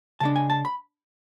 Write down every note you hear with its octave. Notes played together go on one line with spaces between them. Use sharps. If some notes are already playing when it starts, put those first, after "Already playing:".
C#3 G#3 D4 A5
G#5
A5
B5